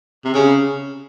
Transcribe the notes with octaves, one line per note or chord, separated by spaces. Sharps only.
C3
C#3